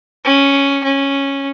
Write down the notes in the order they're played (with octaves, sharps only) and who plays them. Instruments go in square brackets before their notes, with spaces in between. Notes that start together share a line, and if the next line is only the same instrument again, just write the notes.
[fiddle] C#4
C#4